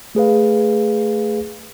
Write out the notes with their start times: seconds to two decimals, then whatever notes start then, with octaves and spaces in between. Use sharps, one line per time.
0.15 A3 G#4 B4 F5